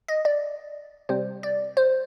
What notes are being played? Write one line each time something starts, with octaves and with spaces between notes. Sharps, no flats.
D#5
D5
C3 G3 C4 C5
D5
C5